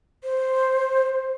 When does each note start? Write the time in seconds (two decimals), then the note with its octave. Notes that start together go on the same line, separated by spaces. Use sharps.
0.23 C5